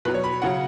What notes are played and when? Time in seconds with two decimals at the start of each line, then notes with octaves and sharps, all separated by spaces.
0.05 B2 F#3 B4
0.14 C#5
0.24 B5
0.42 C#3 F#3 F#5